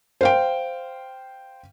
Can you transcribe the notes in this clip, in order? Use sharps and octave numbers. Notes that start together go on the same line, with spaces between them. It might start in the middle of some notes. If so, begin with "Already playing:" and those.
C5 F5 G5